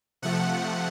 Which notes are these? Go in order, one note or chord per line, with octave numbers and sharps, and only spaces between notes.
C3 F3 A3 F#5